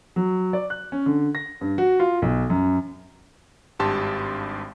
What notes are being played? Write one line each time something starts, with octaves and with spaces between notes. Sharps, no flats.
F#3
D5
F#6
C#4
D3
A#6
G2
F#4
F4
B1
F#2
G#1 G2 G4 A5 C6